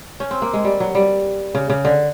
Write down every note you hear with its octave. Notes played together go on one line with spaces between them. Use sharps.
C#4
C4
A#3
G#3
G3
F#3
G3
C#3
C#3
D3